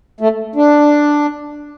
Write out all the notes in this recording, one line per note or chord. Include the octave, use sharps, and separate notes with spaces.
A3
D4